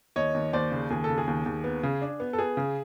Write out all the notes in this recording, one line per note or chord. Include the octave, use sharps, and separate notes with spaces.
D#2 C#5 D#5
D#2
D#2 C5 D5
C#3
D#2 G#4
C#3 A4
G#4
D#2
D#2
B3
C#3
D4
B3
A4
B3 G#4
C#3